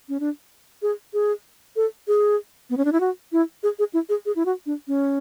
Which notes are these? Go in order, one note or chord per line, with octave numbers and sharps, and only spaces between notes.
C#4
D4
G#4
G#4
A4
G#4
B3
C#4
D4
E4
F#4
E4
G#4
G#4
E4
G#4
G#4
E4
F#4
D4
C#4